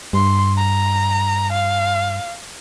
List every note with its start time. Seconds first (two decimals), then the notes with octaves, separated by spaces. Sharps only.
0.13 G2 C6
0.57 A#5
1.52 F5